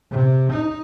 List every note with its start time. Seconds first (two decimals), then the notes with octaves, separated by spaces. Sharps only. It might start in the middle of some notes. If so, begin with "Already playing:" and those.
0.11 C3
0.52 D#4